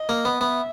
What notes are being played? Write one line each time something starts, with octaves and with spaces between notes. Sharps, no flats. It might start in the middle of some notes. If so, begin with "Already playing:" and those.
Already playing: D#5
A#3
B3
B3 E5